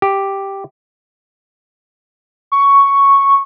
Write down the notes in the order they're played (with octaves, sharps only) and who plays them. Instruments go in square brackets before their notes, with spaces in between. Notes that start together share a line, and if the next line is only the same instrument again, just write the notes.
[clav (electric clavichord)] G4
[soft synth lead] C#6